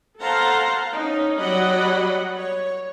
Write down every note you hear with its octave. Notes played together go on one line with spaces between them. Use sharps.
A4 C5 F5 F#5 A5 A#5
C#4 D#4
F#3 G3 D5 D#5 F#5 B5
C#5